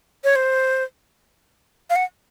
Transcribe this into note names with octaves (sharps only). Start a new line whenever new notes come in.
C#5
C5
F5
F#5